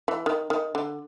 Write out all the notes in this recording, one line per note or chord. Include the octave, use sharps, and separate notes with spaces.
E3
D#3
D#3
D3